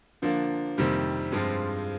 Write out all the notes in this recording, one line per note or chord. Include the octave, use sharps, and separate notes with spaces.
D3 F3 A#3 D4
F2 C3 D#3 G3 A#3
G2 F3 G#3 C4 F4